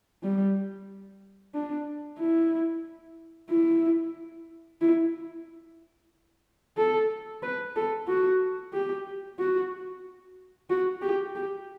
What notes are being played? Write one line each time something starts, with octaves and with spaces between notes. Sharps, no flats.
G3
D4
E4
E4
E4
A4
B4
A4
F#4
G4
F#4
F#4
G4
G4